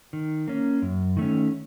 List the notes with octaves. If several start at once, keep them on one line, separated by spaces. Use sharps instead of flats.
D#3
A#3 C#4
F#2
D#3 A3 C#4